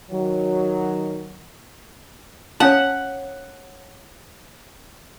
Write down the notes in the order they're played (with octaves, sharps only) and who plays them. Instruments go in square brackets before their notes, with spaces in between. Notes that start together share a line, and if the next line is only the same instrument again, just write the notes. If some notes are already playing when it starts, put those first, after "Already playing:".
[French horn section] D#3 F#3
[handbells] C#4 A5 [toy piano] C#5 F5 [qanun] F#5